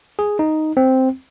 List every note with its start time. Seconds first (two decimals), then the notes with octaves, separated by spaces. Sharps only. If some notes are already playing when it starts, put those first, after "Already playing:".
0.19 G#4
0.39 D#4
0.77 C4